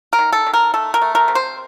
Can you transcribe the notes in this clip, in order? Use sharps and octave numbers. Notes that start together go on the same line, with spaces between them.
A#4
D#3
A4
D#3
A#4
A3 A4
A#4
A3
A#4
C3
C5